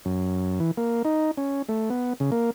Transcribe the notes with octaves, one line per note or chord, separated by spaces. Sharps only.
F#2
E3
A#3
D#4
C#4
A3
B3
C#3
A#3